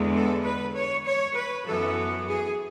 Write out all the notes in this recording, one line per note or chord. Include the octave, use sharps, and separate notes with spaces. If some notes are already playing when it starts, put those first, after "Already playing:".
Already playing: E2 D3 G#3 B3
A4
B4
C#5
C#5
B4
F#2 E3 B3 A4
G#4